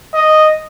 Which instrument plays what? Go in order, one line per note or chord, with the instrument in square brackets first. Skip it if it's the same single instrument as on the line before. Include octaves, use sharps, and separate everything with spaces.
[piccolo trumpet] D#5